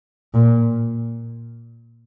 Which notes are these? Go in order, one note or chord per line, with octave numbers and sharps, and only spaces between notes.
A#2